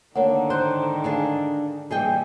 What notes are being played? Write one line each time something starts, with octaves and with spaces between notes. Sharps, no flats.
G#2 D3 D#3 A#3 D4 A#4 C#5 F#5
C5 A#5 F#6
D4 G#4 F5
A#2 E3 G3 G#4 D#5 G5